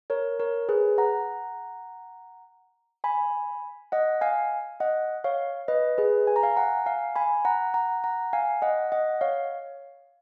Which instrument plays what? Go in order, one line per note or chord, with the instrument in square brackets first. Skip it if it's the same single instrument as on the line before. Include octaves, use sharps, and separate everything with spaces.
[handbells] A#4 C#5
A#4 C#5
G#4 B4
F#5 A#5
G#5 B5
D#5 F#5
F5 G#5
D#5 F#5
C#5 F5
B4 D#5
G#4 B4
G#5
A#5
F5 G#5
F#5 A#5
F5 G#5
G#5 B5
F#5 A#5
F#5 A#5
F#5 A#5
F5 G#5
D#5 F#5
D#5 F#5
C#5 F5